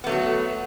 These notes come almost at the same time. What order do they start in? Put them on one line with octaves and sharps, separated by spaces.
B3 A3 F#3 F#4